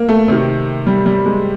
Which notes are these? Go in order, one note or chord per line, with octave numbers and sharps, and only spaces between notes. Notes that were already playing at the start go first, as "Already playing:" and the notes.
Already playing: A#3
A3
C3 D#3
G3
G3
G#3